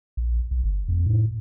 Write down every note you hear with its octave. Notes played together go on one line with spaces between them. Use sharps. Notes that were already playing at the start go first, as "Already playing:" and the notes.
A#1
B1
G1
F2
A2